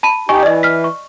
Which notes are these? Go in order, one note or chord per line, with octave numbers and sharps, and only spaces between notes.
A5 B5 D#7
D#4 G4 D#5 G#5 C#6
E3 D5 D#5
F6 B6
C#6